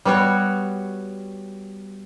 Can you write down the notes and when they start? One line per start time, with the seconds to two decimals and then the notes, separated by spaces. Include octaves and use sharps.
0.05 G3 B3 F#4 C#5